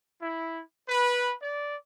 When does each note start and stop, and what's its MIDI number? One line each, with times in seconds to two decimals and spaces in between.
0.21 0.62 64
0.88 1.34 71
1.42 1.77 74